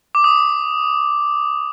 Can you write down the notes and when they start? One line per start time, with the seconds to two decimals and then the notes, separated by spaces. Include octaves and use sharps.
0.15 D6
0.24 D#6